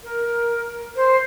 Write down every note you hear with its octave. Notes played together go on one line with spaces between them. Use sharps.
A#4
C5